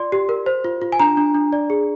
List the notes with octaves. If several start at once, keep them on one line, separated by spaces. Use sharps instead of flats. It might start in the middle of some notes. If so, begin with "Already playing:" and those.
Already playing: F4 D5 C6
G4
A#4
C5
F4
F4
G#5
D4 A#5
D4
D4
D5
G#4